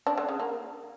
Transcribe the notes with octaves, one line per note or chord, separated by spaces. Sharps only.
D4
D3
C#3
A#3